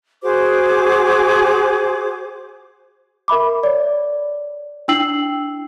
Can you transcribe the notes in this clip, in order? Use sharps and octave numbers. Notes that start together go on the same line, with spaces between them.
F#4 G#4 C5 D6
A#4 E5 B5 D6
C#5 D5
D4 E4 G5 E6 C7 F#7